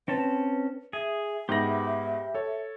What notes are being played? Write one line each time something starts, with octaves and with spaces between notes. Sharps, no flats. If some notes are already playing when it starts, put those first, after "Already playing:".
C4 C#4 B4 A5
G#4 E5
G#2 B3 G4 B5 A#6
A4 C#5